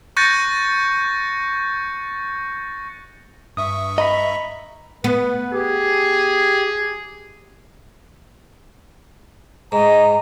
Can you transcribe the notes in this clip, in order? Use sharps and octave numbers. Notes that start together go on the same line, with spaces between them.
C#6 F#6 G6 A6 A#6 C#7
G2 E5 C#6 D#6
D#5 A#5 B5 B6
B3 B4
G4 G#4
G#2 D#5 A#5